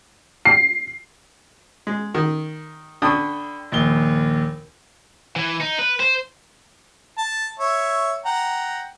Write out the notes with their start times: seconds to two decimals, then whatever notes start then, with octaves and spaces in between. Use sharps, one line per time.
0.45 C7
1.87 G#3
2.15 D#3
3.02 D3 D4 G5 B5 C#6 D#6
3.72 A#1 D#2 G7
5.36 E3
5.61 D#4
5.79 B4
6.00 C5
7.18 A5
7.60 C#5 E5
8.25 F#5 G5 A#5